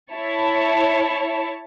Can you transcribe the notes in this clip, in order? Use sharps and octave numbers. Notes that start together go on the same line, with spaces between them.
E4 C#5 A5